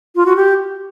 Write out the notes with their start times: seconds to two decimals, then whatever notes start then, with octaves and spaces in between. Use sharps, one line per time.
0.16 F4
0.26 F#4
0.36 G4